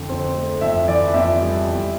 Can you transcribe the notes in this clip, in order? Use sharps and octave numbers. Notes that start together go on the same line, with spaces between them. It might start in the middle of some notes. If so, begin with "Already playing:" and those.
Already playing: F2 D3
C4
A3
F2 E5
E3 D5
F2 E5
G3
E2